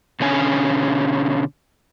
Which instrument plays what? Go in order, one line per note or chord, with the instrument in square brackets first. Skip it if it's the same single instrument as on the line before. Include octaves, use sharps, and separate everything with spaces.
[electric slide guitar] B2 D3 C#4 G#5